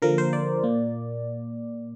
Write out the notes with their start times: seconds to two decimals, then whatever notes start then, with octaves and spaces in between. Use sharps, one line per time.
0.02 D3 F3 A#3 A#4
0.18 C5
0.33 D5
0.63 A#2 A#3